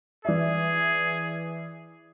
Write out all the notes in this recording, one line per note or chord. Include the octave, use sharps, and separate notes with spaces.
E3 G#4 D5 E5